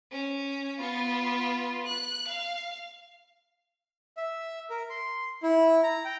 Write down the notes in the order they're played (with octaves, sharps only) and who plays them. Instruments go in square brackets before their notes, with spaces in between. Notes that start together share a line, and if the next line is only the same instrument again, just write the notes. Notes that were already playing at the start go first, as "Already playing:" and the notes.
[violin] C#4
B3 F4
F#6
F5
[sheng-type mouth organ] E5
A#4
C6
E4
A#5
G5